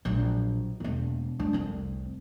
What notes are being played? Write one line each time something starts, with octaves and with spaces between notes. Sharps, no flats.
A#1 F#3
E1 A#3
D4
F1 C2